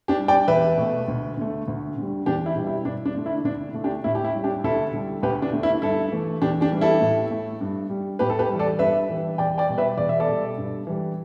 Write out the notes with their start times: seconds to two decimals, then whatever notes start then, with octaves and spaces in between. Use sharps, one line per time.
0.08 D4 G4
0.19 G3
0.28 D5 G5
0.48 E2 B4 E5
0.78 B2 A3
1.08 D2
1.37 D3 A3
1.68 D2
1.97 D3 G3
2.26 E2 D4 G4
2.46 E4
2.56 B2 G3
2.67 E4
2.85 G2 D4
3.05 D4
3.15 D3 A3
3.26 E4
3.44 D2 D4
3.74 D3 A3
3.84 D4 G4
4.04 A2 E4
4.15 G4
4.25 E4
4.35 G3
4.44 D4 G4
4.64 D2 E4 A4
4.93 D3 G3
5.23 D2 G4 B4
5.42 D4
5.53 D3 A3
5.63 E4
5.82 G2 E4 A4
6.12 E3 A3
6.42 E2 D4 G4
6.61 D4 G4
6.72 E3 G3
6.81 E4 A4
7.01 A2
7.31 A3
7.61 G2
7.90 G3
8.19 A2 G4 B4
8.30 A4
8.39 G4 B4
8.49 E3 G3
8.59 A4 D5
8.79 G2 B4 E5
9.09 E3 G3
9.38 E2 D5 G5
9.58 D5 G5
9.68 B2 G3
9.78 B4 E5
9.98 E2 D5
10.09 E5
10.20 A4 D5
10.28 B2 G3
10.57 G2
10.87 E3 G3